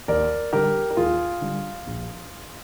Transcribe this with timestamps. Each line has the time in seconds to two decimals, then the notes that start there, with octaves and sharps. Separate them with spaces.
0.08 D#2 A#4 D5
0.53 D3 G3 G4 A#4
0.91 A#4
0.97 D#2 F4 G#4
1.41 D3 G3
1.87 A#1